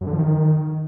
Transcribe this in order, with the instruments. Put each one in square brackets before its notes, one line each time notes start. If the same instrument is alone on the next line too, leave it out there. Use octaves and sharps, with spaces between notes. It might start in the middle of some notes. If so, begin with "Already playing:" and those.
[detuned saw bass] F#2
D3
F3
D#3